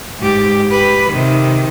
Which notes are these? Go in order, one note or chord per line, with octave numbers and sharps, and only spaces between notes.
G#2 G4
G4 B4
C3 D#3